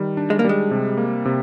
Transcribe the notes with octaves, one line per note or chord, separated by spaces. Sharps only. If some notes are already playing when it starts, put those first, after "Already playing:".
Already playing: D#3 G3
D4
G#3
A#3
G3 G#3
C3
A#3
C3